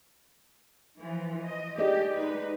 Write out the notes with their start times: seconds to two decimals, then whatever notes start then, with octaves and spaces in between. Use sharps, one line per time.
1.00 E3 F3 F4
1.42 D#5
1.79 G4 G#4 D5 D#5
2.15 G#3 D#4 B4